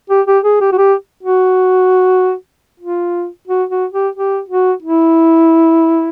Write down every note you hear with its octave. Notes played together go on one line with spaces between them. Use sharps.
G4
G4
G#4
G4
F#4
G4
F#4
F4
F#4
F#4
G4
G4
F#4
E4